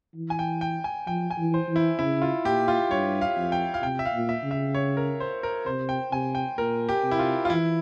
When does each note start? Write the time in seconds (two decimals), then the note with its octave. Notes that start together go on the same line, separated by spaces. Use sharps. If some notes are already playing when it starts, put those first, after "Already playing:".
0.15 E3
0.30 G#5
0.39 G5
0.61 G5
0.84 G#5
1.07 F3 G5
1.30 G#5
1.38 E3
1.54 C5
1.69 E3
1.76 E4
1.99 C#3 E4
2.22 F4
2.45 A#2 G4
2.68 F4
2.91 G2 C#5
3.21 F5
3.37 F2
3.52 G5
3.74 F5
3.83 C3 G5
3.99 E5
4.05 F5
4.13 A#2
4.29 E5
4.44 C#3
4.51 E5
4.75 C#5
4.97 A#4
5.20 C5
5.43 A#4
5.66 C3 C5
5.89 G5
6.12 C3 G#5
6.35 G5
6.58 A#2 A#4
6.89 G4
7.04 C3
7.11 E4
7.19 F4
7.45 F4
7.50 E3 E4